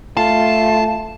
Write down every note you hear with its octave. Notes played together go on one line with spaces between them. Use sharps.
A3 F4 A5